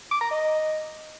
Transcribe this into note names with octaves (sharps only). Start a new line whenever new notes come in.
D6
A#5
D#5